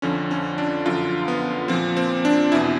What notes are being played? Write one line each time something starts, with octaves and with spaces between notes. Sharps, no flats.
F2 D3 F3 C#4
C#4
D4
F#2 D3 F3 F4
B3
A#2 F3 C4
C4
D4
E2 B2 E4